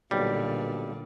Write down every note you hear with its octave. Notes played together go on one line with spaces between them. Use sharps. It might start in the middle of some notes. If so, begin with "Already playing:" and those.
B1 A#2 D3 G3